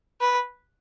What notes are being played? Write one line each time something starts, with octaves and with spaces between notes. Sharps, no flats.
B4